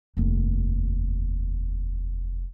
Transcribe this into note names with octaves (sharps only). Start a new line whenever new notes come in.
F1 D#2